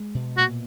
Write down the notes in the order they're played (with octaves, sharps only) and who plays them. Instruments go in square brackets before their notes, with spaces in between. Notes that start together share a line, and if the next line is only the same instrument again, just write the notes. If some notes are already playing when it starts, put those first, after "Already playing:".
Already playing: [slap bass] G#3
B2
[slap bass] A#2 [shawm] F#4